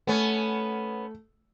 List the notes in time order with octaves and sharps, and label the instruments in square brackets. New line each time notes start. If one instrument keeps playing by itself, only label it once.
[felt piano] A3 [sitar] B3 C#4